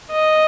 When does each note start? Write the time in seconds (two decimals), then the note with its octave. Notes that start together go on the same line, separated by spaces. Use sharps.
0.11 D#5